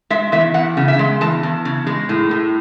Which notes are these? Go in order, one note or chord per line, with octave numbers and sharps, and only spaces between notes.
G#3 E5
E2 E5
E2 F#5
C#3
E5
G#3
E2 A5
E2
C#3
G#3
A2
A2